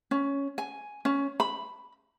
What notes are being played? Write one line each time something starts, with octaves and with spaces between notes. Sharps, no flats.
C#4
G#5
C#4
B5